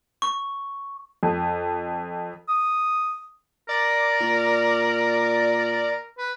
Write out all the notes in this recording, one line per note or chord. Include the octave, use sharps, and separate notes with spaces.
C#6
F2
D#6
A#4 D5
A#2
B4